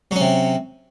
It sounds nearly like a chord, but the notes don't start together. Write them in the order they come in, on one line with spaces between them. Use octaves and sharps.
F#3 C#4 C3